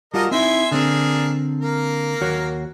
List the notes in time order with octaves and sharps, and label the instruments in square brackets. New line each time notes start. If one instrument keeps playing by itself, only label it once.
[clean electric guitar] G3 F4 F#4 [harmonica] A#4 D#5 A5
[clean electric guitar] C4 D#4 E4 [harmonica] E5 G#5 C6
[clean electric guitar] D3 C4 [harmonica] A#3 D4 G#4
[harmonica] A#3 A#4
[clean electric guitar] D#2 F#4 C#5